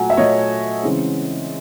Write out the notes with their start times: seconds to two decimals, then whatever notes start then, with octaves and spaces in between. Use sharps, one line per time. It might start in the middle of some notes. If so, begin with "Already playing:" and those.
Already playing: A#2 F#3 A3 F#5 G#5
0.10 E5
0.17 A#2 F#3 A3 C#5 D#5
0.83 C#3 E3 G#3 C4